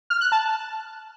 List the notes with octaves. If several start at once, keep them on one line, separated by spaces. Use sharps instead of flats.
F6
F#6
A5